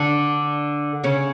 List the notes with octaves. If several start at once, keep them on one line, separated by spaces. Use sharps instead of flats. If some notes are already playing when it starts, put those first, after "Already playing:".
Already playing: D3 D4
C#3 C#4